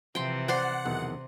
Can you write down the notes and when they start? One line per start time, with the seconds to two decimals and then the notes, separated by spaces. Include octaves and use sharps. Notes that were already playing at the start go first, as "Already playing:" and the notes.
0.15 C3 E3 F3 G5 C6
0.48 C5 D5 F#5 C6
0.85 B1 E2 C3 D#3